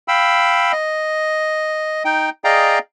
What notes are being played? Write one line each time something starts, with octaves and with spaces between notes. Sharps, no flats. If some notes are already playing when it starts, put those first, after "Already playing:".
F5 G5 B5 E6
D#5
D#4 G5
G#4 D5 D#5 F5 G5 A#5